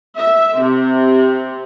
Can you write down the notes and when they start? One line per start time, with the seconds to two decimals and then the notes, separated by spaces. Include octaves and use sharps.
0.18 E5
0.60 C3